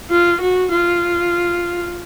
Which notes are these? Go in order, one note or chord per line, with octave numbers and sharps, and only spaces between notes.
F4
F#4
F4